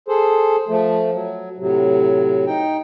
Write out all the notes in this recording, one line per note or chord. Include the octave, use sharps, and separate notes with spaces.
G#4 A4 C5
F3 A3
F#3
A2 C3 F#3
D#4 G5